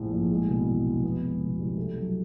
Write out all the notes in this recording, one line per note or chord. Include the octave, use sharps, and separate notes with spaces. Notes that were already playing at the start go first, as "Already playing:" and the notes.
Already playing: A#1 A2 F3
A#1
G#3
B2
E2
F1
B3
G#3
B2
C2
A3
F#3